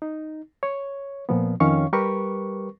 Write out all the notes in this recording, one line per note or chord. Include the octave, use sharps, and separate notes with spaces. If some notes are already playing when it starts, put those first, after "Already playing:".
D#4
C#5
A#2 F3 B3
F2 D#3 C#4 C#5 F5 C#6
G3 G4 A#4 B4 C#6